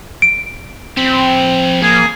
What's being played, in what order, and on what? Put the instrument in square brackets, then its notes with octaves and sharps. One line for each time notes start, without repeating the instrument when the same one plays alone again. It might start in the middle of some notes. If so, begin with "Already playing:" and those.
[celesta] D7
[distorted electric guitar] F3 B5 [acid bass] C4
[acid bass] A#3 [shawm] G#4